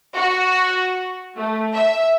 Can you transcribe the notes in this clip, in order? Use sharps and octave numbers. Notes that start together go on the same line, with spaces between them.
F#4
A3
E5